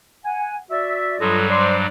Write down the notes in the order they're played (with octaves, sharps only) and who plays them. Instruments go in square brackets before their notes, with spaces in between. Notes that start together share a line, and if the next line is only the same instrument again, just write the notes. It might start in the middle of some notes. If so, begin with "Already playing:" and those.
[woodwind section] F#5 G#5
F#4 D5 E5
[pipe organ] G2 F#3 G3 [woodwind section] F4 D#5 [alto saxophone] A4
[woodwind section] C5 C6 [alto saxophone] D5